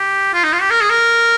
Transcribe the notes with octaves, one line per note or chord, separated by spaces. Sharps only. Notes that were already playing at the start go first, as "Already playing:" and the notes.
Already playing: G4
F4
D#4
F4
G4
A#4
G#4
A#4